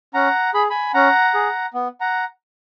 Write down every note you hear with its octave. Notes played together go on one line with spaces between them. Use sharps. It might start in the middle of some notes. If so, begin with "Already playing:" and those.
C#4 F#5 A#5
G#4 B5
G#5 B5
C#4 F#5 A#5
G#4
B3
F#5 A#5